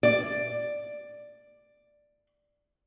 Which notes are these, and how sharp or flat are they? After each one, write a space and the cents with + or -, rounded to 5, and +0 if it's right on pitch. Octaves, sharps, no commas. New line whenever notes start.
D5 +5